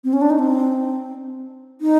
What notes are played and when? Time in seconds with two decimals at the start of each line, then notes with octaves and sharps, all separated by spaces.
0.04 C4
0.13 C#4
0.21 D4
0.30 D#4
0.39 C4
1.81 D#4